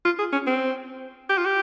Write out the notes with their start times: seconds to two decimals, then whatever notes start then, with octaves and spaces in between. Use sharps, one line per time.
0.05 F4
0.18 G#4
0.32 C#4
0.47 C4
1.29 G4
1.37 F4
1.45 G4